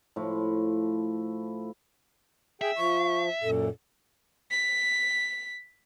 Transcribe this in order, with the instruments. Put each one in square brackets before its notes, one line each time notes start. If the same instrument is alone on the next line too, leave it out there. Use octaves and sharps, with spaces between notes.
[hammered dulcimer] A2 F3 E4
[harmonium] G#4 G5 [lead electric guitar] E5
[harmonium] F3 [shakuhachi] C#6
[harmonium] F#2 A#2 [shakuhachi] A4
[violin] B6